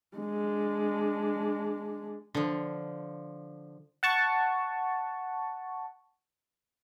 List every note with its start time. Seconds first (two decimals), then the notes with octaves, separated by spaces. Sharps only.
0.17 G#3 D4
2.35 D3 F3
4.03 F#5 A5 C#6